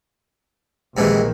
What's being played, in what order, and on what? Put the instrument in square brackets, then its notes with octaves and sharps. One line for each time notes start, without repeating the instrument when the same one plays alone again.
[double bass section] A#1 D#3 [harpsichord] G#2 C3 E3